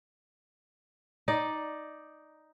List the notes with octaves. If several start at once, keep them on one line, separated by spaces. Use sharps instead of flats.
D#4 D5